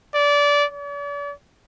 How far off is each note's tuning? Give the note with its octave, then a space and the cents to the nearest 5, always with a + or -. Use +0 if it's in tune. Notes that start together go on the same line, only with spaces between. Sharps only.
D5 -20
D5 -45